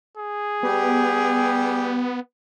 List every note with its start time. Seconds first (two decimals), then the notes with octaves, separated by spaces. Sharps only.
0.17 G#4
0.63 G3 B3 G4